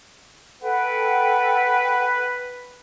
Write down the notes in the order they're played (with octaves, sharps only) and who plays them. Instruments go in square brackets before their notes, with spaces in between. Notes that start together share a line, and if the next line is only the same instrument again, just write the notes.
[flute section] A4 F#5 G5 [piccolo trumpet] B4